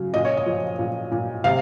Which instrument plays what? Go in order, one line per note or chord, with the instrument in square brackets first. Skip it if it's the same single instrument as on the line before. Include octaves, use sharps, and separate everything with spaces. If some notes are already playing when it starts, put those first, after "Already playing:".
Already playing: [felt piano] C#3 F#3
A#2 D#5
C#5
D#5
F3
A#2
A#2
C3 F5